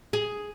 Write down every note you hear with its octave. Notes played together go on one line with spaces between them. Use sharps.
G#4